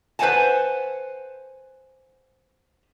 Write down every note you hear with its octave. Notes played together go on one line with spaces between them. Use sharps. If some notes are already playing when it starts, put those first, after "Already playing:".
B4 C5 D#5 F#5 G#5 A5